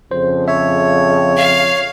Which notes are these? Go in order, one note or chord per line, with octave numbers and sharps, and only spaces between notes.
F2 C#3 C5
C#5 E5
F5